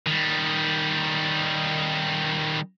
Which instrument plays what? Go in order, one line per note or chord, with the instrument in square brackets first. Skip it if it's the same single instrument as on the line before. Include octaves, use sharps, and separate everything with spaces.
[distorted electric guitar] D#3 G3